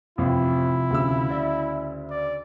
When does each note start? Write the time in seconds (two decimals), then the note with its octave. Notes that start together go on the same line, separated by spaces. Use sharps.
0.18 A1 F2 C3 F3 E4 F4
0.90 D2 C#3 E6
1.31 D5 E5
2.10 D5